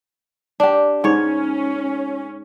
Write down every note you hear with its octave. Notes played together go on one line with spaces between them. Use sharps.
D4 G4
G#2 C#4 C#5